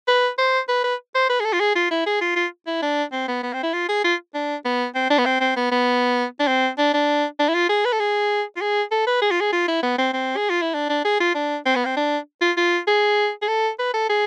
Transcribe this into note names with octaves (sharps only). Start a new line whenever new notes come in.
B4
C5
B4
B4
C5
B4
G#4
A4
F4
G#4
F4
E4
G#4
F4
F4
E4
D4
C4
B3
B3
C4
E4
F4
G#4
F4
D4
B3
C4
D4
B3
C4
C4
B3
B3
D4
C4
D4
D4
D4
E4
F4
G#4
B4
A4
G#4
F4
G#4
A4
B4
G#4
F4
G#4
F4
E4
B3
C4
C4
G#4
F4
E4
D4
D4
G#4
F4
D4
C4
B3
C4
D4
F4
F4
G#4
G#4
A4
B4
A4
G#4